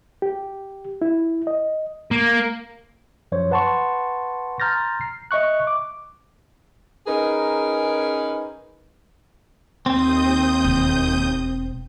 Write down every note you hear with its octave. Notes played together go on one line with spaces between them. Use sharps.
G4
E4
D#5
A#3
F#2 F3 C5 C#5
B4 F#5 A5 C6 C#6
A#5 C6 F6 G6 A6 A#6
C7
D#5 E5 C#6 F#6
D6
C#4 D#4 G#4 A#4 B4
D#2 C4 D#6 G6
E1